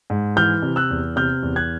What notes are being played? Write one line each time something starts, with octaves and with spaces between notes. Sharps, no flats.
G#2
E3 F6 G6
C3
E6 F#6
E2
C3 F6 G6
E2
F#6 G#6